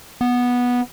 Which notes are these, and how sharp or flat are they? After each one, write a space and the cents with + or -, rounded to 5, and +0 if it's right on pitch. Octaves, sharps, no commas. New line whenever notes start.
B3 -10